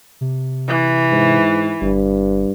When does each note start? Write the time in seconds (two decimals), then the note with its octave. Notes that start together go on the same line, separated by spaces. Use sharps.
0.21 C3
0.67 E3
1.11 G#2
1.81 G1 G2